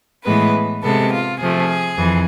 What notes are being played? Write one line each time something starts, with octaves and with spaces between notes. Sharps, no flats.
A2 E3 G#3 B3 B4
C3 G#3 B3 A4
F4
C3 F3 A3 G#4
F2 E3